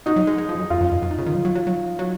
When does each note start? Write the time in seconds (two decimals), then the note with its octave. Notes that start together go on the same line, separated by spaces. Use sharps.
0.06 F#3 D#4
0.16 F#3
0.27 G#3
0.38 G#3
0.49 F3
0.55 F2
0.59 F#2
0.70 F2 F4
0.81 F#2
0.92 F2
1.02 F#2
1.11 D#3
1.18 C#3
1.26 D#3
1.34 F#3
1.45 F#3
1.55 F#3
1.67 F#3
1.99 F#3